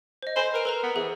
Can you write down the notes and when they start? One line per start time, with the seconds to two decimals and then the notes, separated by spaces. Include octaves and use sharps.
0.23 C5 D#5
0.36 A4 C5 G#5 B5
0.54 A#4 B4 D7 D#7
0.65 A4 B4 A#5
0.83 B3
0.96 E3 G#4 C5